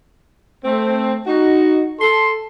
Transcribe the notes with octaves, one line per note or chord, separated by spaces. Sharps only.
A3 C4
D#4 F#4
A4 C6